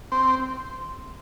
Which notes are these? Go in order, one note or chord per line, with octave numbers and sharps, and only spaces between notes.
C4